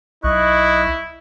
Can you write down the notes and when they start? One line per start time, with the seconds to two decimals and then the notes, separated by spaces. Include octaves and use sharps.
0.24 B1 E4 D#5 C#6 F#6